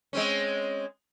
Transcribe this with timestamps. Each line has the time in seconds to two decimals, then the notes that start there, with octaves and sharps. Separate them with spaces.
0.13 G#3 C4 C#4